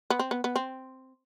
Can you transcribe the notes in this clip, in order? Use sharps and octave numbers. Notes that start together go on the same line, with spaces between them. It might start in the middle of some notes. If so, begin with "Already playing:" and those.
B3
C4
B3
B3
C4